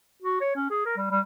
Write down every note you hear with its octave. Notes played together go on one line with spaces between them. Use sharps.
F#4
C#5
C#4
G#4
A#4
G3
G3